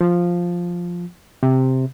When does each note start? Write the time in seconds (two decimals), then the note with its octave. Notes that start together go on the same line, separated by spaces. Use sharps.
0.01 F3
1.43 C3